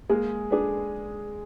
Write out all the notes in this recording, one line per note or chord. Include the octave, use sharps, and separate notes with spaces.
G#3 A#3 G#4
D4 G#4 B4